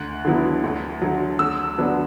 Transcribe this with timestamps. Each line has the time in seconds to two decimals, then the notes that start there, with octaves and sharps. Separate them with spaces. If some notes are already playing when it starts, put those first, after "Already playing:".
Already playing: D2 F#6
0.25 D3 F#3 B3 E4
0.64 D2
1.02 D3 F#3
1.39 D2 E6
1.78 D3 F#3 B3 D4